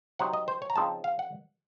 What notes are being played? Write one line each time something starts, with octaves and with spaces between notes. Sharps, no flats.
C3 F#3 C4 D#4 F#5
D#5
C5
C#5
A#5
C#3 F3 C4 D#4 A5
F5
F#5